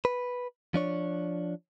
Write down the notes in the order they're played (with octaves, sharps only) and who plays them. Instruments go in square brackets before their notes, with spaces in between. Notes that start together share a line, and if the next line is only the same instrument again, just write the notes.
[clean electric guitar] B4
F3 D4 C#5